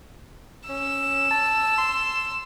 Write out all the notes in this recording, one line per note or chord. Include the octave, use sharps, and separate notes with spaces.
C#4 E6
A5
C6